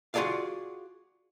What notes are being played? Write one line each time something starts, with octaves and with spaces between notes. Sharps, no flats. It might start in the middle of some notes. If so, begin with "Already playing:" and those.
F4 F#4 G#4 A4 D5 F5